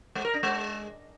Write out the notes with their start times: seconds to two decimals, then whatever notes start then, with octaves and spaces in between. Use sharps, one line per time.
0.15 G#3
0.25 A#4
0.34 D4
0.43 G#3